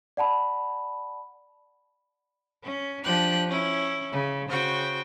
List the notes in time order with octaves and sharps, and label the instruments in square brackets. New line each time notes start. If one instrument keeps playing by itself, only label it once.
[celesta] D5 F#5 A5 B5
[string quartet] C#4
F3 D4 G4 F#6
C#4 E4
C#3
C#3 F#4 C5 G5